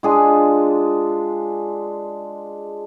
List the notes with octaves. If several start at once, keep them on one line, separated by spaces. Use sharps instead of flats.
G#3 D4 F4 G#4